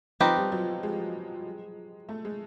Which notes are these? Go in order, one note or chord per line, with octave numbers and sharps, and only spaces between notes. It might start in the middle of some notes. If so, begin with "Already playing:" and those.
F3 C4 D#4 G4 B4
G3
F#3
G#3
A3
G#3